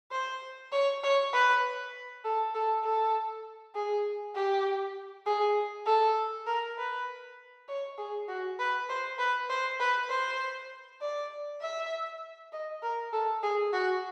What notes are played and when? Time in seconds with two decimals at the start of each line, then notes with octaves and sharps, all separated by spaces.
0.11 C5
0.72 C#5
1.03 C#5
1.33 B4
2.24 A4
2.54 A4
2.84 A4
3.75 G#4
4.35 G4
5.26 G#4
5.86 A4
6.46 A#4
6.78 B4
7.68 C#5
7.98 G#4
8.28 F#4
8.59 B4
8.89 C5
9.19 B4
9.49 C5
9.80 B4
10.09 C5
11.01 D5
11.61 E5
12.52 D#5
12.83 A#4
13.13 A4
13.43 G#4
13.73 F#4